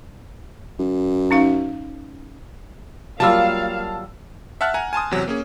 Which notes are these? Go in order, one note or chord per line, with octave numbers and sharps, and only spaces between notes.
F#2
C#4 D#4 F5
F#3 G3 A#3 F4 F5 A5 E6
E5 F#5 A5 F6 F#6
F#5 G#5 A#5
G#5 A5 C6 D#6
E2 C3 F#3
A#3 C#4 G#4